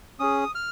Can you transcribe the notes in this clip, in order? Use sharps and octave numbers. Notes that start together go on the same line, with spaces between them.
C#4 G#4 D#6
F6